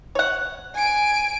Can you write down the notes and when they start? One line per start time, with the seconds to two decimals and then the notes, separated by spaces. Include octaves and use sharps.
0.15 C#5 F#5
0.75 G#5 D7